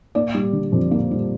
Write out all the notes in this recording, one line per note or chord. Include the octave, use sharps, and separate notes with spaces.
A#3 D5
G3
D3
F2
A#3
G3